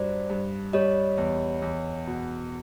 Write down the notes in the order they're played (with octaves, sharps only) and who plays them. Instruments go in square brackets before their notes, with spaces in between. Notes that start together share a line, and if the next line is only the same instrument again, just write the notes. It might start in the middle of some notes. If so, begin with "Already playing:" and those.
Already playing: [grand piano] G2 F#3 [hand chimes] C5 D5
[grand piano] G2
[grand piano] G3 [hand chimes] C#5 D#5
[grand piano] E2
E2
B2